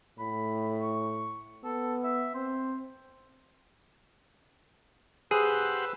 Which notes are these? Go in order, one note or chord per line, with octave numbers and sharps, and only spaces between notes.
A2 B5
C#6
B3 A4
E5
C4 C5
G4 G#4 B4 C5 F#5 E6